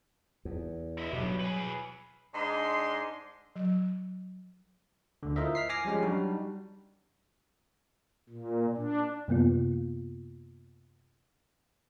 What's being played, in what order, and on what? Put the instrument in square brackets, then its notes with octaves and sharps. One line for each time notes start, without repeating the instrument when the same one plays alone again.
[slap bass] E2
[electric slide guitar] E4 D#5 E5
[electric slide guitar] G2 G3 B3 [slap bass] B2 F#3
[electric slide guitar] G#4 B4
[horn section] G#2 D4 D#5 C6
[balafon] F#3
[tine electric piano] D2 D3
E4 F4 A#4 C5 D#5 E5
F6 B6 C7
G#5 D6 F6 A#6 C7
F3 G3 G#3 C#4 G4
F#3 G3 D4 D#4 F#4
[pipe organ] A#2
D4
[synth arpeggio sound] F#2 C3 A#3 B3 F4